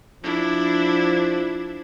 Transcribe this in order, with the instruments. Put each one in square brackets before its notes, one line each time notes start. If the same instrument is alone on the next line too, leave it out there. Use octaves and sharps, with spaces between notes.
[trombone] F3 [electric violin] D4 E4